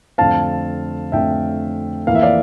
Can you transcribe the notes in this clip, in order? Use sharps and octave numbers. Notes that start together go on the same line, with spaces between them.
F2 D3 A3 C4 F5 A5
F2 D3 A3 C4 E5 G5
F2 E3 A#3 F5
E5
D5 F5